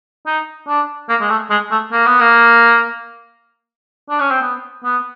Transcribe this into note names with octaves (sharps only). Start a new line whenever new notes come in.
D#4
D4
A#3
G#3
A3
G#3
A3
A#3
B3
A#3
D4
C#4
C4
B3
B3